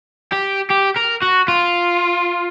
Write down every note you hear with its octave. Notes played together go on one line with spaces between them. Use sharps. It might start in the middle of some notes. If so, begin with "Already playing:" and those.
G4
G4
A#4
F#4
F4